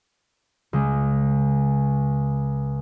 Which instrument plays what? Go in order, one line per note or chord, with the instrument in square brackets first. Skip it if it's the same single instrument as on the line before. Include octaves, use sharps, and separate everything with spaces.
[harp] C#2 G#3